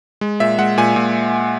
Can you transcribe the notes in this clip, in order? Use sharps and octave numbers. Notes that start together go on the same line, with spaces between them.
G#3
A#2 E5
G#3 F#5
A#2 G#5
A#2